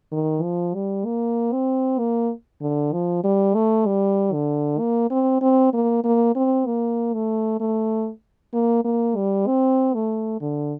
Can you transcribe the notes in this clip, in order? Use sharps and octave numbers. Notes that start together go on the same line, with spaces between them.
D#3
F3
G3
A#3
C4
A#3
D3
F3
G3
A3
G3
D3
A#3
C4
C4
A#3
A#3
C4
A#3
A3
A3
A#3
A#3
G3
C4
A3
D3